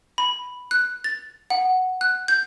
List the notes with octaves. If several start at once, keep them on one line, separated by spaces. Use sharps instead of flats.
B5
F#6
A6
F#5
F#6
G6